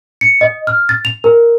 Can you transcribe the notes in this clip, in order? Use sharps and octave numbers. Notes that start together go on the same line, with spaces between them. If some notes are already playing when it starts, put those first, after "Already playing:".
C#7
D#5
F6
A6
F7
A#4